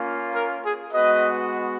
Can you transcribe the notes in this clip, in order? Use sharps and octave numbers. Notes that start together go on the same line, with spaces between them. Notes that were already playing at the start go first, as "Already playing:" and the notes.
Already playing: A#3 C#4 F4
A#4
G#4
G#3 B3 F#4 B4 D#5